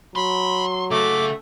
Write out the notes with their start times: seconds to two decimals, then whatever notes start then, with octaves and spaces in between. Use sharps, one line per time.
0.16 F#3 B5 C6
0.91 C#3 A3 F#4 D6